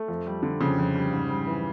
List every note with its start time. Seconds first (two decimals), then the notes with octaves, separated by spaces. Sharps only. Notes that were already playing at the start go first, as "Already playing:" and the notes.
Already playing: A3
0.08 F2
0.27 G3
0.43 D3
0.61 F2 C#3
0.78 F2
0.95 G3
1.13 G#2
1.29 G3
1.47 E3